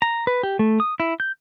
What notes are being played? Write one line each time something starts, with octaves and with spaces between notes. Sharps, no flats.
A#5
B4
G4
A3
D#6
E4
G6